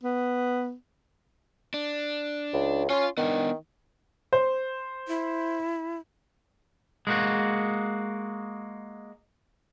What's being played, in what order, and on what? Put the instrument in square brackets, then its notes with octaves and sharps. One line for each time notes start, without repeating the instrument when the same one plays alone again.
[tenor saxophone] B3
[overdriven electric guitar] D4
[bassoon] C#2
[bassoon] C#4 [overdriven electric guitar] F4 C6
[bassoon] D#3 [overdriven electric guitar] B3 D4
[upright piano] C5
[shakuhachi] E4
[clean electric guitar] G#3 A#3 F#4